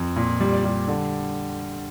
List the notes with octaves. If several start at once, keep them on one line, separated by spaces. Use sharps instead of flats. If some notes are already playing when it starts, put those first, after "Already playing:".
Already playing: F2
A#2
G3
D5
G3
D3